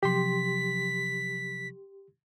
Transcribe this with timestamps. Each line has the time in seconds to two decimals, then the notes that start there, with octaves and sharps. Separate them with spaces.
0.03 C3 F3 F#3 G4 C6 B6